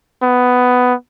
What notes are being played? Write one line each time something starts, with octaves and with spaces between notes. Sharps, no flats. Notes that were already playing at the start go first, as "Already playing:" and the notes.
B3